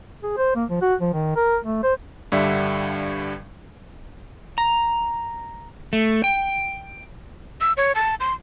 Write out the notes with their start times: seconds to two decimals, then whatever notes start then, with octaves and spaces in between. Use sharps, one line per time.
0.23 G#4
0.37 C5
0.56 A#3
0.70 F3
0.82 F#4
1.01 F3
1.13 D#3
1.36 A#4
1.64 A3
1.83 C5
2.32 G2 D3 G3 E5
4.58 A#5
5.93 A3
6.24 G5
7.61 E6
7.77 C#5
7.95 A5
8.20 C6